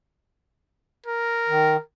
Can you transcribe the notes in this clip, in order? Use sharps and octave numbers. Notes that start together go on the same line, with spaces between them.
A#4
D#3